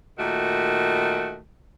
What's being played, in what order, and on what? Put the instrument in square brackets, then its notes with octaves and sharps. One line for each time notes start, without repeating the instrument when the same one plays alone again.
[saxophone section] A#2 D#3 A3 F#4